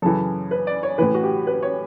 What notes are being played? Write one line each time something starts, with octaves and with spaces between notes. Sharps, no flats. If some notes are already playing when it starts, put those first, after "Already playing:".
F#2 C#3 E3 A4
B4
D5
C#5
A2 E3 B4
F#4
G4
B4
C#5